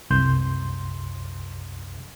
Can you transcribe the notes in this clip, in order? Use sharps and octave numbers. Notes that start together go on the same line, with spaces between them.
C2 F#2 C6 G6